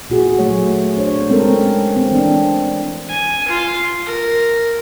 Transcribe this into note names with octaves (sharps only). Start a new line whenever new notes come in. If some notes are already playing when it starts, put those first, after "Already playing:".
A#2 F#4 G#4
F#3 A3 C#5
D4 C5 C#5
G#3 C4 C#4 A4 A#4
C4
E3 D4
G#5
F4
A#4